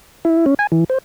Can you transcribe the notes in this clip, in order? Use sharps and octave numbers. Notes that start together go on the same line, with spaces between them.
E4
C#4
G#5
E3
C5